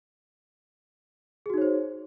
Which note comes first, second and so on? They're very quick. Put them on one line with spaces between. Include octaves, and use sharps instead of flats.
G#4 F#4 D#4 C#5 C5